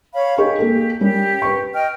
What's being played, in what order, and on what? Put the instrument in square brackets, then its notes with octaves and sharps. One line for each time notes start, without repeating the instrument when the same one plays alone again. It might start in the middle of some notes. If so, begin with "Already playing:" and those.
[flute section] C#5 F5 B5
[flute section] G4 [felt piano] G#4 D#5 C#6
[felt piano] A#3 G#4 A4
[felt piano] G3 C#4 A#4 [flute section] G4
[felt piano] B4 C#6
[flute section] D#5 G5 F6